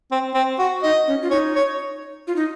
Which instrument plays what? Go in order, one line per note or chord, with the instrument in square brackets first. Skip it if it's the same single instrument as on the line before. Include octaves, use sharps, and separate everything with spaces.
[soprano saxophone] C4
C4
F#4
[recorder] D#4 [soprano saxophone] D#5
[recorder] C#4
F4
[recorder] D#4 [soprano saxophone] C#5
[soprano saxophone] C#5
[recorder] F4
D#4